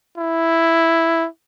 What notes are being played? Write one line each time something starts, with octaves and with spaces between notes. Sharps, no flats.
E4